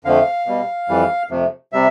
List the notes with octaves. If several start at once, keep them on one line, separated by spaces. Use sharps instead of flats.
F2 D3 F3 A3 F5
B2 G3
F2 E3 G3
F2 C3 F3 A3
C3 G3 E5